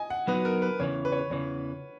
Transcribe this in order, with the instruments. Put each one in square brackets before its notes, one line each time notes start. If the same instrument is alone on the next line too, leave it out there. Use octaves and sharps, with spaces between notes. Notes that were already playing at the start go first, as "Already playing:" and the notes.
Already playing: [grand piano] D#5 G#5
F#5
[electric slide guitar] F#3 B3 D#4 F#4 [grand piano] B4
[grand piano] A#4
B4
[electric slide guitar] E2 C#3 E3 [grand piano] C#5
[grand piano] B4
C#5
B4
[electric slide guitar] E2 C#3 E3 [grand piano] C#5